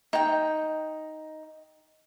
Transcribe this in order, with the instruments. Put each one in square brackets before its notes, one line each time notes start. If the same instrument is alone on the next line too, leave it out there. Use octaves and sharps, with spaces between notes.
[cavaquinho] D#4 G5